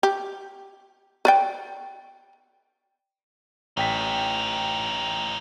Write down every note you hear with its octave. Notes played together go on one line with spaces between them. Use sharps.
G4
B4 D5 G5
A1 E3 D#4 G5 B6